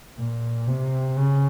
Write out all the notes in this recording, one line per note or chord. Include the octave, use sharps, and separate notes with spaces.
A#2
C3
C#3